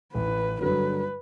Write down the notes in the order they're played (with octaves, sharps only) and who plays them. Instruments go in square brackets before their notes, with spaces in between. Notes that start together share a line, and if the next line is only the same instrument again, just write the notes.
[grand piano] A1 [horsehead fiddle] B4
[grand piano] G2 D3 F#3 [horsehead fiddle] B4